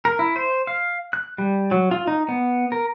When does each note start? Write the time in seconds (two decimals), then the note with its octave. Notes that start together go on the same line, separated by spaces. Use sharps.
0.05 A#4
0.19 E4
0.36 C5
0.67 F5
1.13 F#6
1.38 G3
1.71 F#3
1.91 F4
2.07 D#4
2.28 B3
2.72 A#4